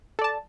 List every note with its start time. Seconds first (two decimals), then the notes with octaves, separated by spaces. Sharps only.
0.19 A4
0.21 D5
0.24 A5